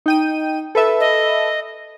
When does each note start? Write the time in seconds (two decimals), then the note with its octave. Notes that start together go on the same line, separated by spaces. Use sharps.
0.06 D#4 G5 D#7
0.75 A4 B4 E5
1.00 D#5